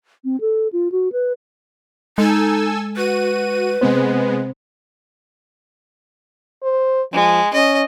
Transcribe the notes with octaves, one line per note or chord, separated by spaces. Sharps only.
C4
A4
F4
F#4
B4
G#3 D#4 A4 G#5 E6
F#4 B4 D#7
C3 G#3 B3 C4 C5
C5
F3 G#3
C#4 D#5